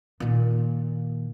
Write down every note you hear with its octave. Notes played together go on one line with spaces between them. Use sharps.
A#2 D#3